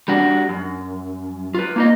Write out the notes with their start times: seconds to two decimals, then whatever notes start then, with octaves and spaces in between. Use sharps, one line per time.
0.08 G3 D4 F#4
0.49 F#2
1.54 F4 B4
1.76 A#3 D#4 D#5